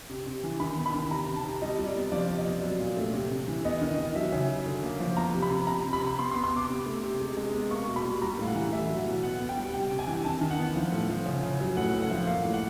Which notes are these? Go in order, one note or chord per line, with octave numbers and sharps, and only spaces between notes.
C3
C3
E3
D#3 B5
B3
B5
D#3
C3 A#5
C3
A5
C3
G3 D#5
G3
D5
B3
F3 D5
C3
D#5
B3
F#3
A#2
A3
C3
C3
E3
B3 D#5
D#3
D#5
D#3
F#3 E5
C#3
F#3
D3
A#3
F3
B3 A#5
C3
B5
C3
C3 A#5
C3
B5
C3
B3 C6
C6
B3
C6
B3 D6
C3
A3
C3
G#3
G#3
B3
A#3 C#6
B2
B5
G3
G3 A#5
A2 F5
F#5
E3
A3 E5
F#3
F#5
B2
B3 F#5
B3
G5
G3
C3 G5
C3
G#5
E3
D#3 A5
D#3
F#5
B3
F3
A2
F3
C#3
C#3
F#3
A2 F#5
A2
F#5
F3
A#3 F5
A2
F#5